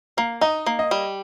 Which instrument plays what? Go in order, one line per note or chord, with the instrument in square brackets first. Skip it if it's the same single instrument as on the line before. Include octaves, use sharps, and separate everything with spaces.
[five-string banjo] A#3 [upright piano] F5
[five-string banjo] D#4 [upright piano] D#5
[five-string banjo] A#3
[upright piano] D#5
[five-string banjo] G3